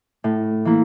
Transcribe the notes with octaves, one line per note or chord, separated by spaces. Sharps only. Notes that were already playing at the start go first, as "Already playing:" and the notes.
A2
E3 A#3 E4